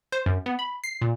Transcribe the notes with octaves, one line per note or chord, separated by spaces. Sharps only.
C5
F#2
B3
B5
C7
A#2